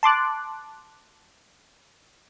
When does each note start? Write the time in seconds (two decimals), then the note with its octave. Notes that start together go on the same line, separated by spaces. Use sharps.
0.03 A5 C6 D6 F#6